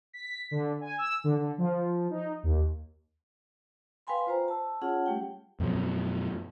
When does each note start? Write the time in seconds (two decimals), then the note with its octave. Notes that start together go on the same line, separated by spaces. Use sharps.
0.13 B6
0.51 D3
0.81 G#5
0.98 E6
1.24 D3
1.37 D3
1.58 F3
2.10 D#4
2.43 D#2
4.07 B4 F5 G5 G#5 B5 C6
4.27 F4 C5 A#5
4.48 A5 E6
4.81 C#4 F4 G#4 C#5 F#5 A5
5.06 G3 A3 G4 G5
5.60 F#2 B2 F3 F#3